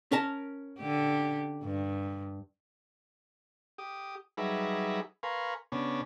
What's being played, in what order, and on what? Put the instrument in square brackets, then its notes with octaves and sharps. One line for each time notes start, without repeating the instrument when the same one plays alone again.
[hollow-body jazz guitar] C#4 A#4 A5
[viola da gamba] D3 G4
G2
[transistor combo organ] G4 D#6
F#3 G3 D#4 G#4 B4 E5
A#4 B4 F5 G#5 C6 C#6
C#3 B3 C#4 D4